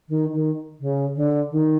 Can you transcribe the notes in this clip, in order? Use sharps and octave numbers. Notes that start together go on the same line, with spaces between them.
D#3
D#3
C#3
D3
D#3